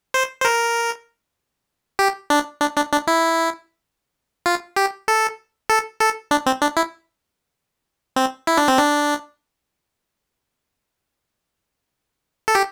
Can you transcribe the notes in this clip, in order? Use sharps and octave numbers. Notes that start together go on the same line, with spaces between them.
C5
C5
A#4
G4
D4
D4
D4
D4
E4
F4
G4
A4
A4
A4
D4
C4
D4
E4
C4
E4
D4
C4
D4
A4
G4